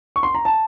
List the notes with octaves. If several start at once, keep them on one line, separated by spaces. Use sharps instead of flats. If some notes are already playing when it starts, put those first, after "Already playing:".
C#6
C6
A#5
A5